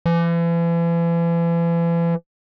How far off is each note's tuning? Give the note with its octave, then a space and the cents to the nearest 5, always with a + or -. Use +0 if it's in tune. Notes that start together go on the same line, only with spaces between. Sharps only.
E3 +40